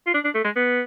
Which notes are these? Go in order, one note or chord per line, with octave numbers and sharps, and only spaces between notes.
F4
D4
D4
A3
G#3
B3